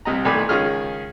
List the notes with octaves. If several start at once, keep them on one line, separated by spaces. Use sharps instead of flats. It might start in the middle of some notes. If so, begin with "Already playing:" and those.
C2 C3 D#5 A#5
B1 A2 D#3 D5 G#5 B5
C#2 D#3 C#4 F4 G#4 F6